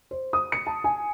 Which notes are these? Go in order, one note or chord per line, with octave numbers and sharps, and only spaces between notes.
C5
D#6
C#7
A5
G#5